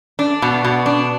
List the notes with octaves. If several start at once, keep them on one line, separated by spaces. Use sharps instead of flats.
D4
B2
B2
D4